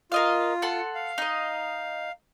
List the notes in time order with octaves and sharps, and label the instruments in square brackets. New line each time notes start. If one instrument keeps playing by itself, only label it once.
[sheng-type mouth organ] F4 [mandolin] A#4 D#5 F5
[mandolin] A4 F#5 C6
[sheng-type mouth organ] F5
[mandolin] D#4 D#5